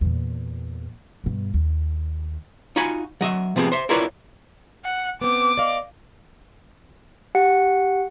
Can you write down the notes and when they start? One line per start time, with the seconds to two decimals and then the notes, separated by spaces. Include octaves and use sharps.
0.01 E2 A#2
1.24 G2 B2
1.54 D#2
2.76 D#4 F4 F#4 G#5 B5
3.21 F#3 D#5 E5
3.56 C3 F3 B3 C4 G#4
3.72 C5 E5
3.89 E4 F4 A#4 B4 C#5 D5
4.84 F#5
5.21 B3 C4 D6
5.57 D5 D#5 F5
7.35 G4 F#5 C#7